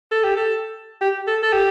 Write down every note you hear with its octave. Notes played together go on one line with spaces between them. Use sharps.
A4
G4
A4
G4
A4
A4
G4